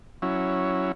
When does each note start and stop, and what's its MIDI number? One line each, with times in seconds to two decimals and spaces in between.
0.22 0.92 54
0.22 0.92 61
0.22 0.92 64